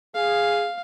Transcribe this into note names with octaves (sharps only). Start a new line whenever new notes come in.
G#4 F5